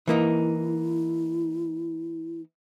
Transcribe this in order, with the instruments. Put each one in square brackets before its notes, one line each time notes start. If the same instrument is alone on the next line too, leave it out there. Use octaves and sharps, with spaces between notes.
[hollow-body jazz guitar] E3 A#3 D#4 [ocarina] E4